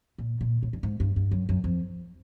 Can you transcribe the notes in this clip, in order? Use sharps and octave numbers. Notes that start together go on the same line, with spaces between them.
A#2
A#2
A2
G2
G#2
G2
G2
F#2
F#2
F2